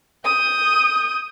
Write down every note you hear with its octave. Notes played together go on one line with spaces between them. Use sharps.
D#6 G6